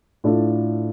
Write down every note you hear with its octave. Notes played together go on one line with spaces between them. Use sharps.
A2 A3 D4 F4 A4